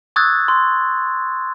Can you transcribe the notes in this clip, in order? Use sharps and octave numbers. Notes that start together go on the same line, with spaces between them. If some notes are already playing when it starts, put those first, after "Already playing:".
C#6 D#6 E6 F#6 G#6 A6
C6